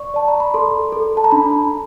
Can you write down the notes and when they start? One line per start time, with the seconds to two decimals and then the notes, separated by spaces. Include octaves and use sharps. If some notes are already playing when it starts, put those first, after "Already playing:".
Already playing: D5 C#6
0.14 D5 A5
0.28 A#5
0.40 B5
0.54 A4 C6
0.92 A4
1.17 A5
1.24 A#5
1.32 D4 B5